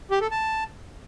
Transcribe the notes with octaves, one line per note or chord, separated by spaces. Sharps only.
G4
A4
A5